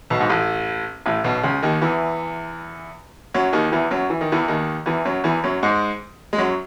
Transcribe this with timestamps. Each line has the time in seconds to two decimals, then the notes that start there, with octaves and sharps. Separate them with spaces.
0.10 B1 B2
0.20 G#2
0.29 A1 A2
1.06 A1 A2
1.24 B1 B2
1.43 C#2 C#3
1.63 D#2 D#3
1.81 E2 E3
3.34 F#2 F#3
3.53 D#2 D#3
3.72 E2 E3
3.91 F#2 F#3
4.10 E3
4.21 D#3
4.32 E2 E3
4.48 D#2 D#3
4.86 E2 E3
5.05 F#2 F#3
5.24 E2 E3
5.44 F#2 F#3
5.63 G#2 G#3
6.33 G#3
6.38 F#2 F#3